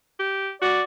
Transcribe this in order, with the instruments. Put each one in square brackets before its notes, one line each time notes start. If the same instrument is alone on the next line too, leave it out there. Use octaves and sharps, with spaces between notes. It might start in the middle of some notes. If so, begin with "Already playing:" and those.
[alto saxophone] G4
[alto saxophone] F#4 [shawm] D5